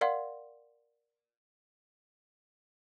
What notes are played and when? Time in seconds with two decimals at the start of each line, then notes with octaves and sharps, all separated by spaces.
0.01 A#4 D5 F5 F#5 C6